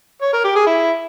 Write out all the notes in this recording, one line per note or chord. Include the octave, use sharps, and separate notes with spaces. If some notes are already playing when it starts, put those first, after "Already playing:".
C#5
A#4
G4
G#4
E4